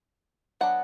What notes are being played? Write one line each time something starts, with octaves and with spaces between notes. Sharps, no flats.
F#3 B3 D4 F#5